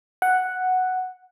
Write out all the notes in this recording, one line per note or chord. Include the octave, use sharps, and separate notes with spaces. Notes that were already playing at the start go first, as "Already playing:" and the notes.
F#5